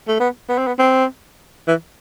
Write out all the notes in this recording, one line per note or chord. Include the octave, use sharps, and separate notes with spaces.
A3
B3
B3
C4
B3
C4
E3